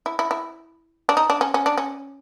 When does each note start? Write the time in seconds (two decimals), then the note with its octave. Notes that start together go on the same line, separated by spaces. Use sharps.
0.06 E4
0.19 E4
0.31 E4
1.09 D4
1.17 D#4
1.30 D4
1.41 C#4
1.54 C#4
1.66 D4
1.78 C#4